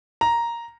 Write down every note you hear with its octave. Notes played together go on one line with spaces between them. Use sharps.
A#5